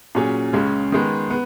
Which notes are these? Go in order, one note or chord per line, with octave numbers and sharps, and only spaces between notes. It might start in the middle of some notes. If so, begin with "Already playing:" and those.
A#2 F#3 C#4 G#4
C#2 C#3 G#3 C#4
D#3 G#3 B3
B3